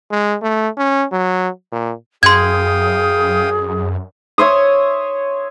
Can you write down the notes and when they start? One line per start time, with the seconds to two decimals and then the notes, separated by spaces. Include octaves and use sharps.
0.11 G#3
0.42 A3
0.78 C#4
1.12 F#3
1.72 A#2
2.23 F#2 G#4 F5 G5 C6 D#6 G#6
4.38 C#5 E5 C6 D#6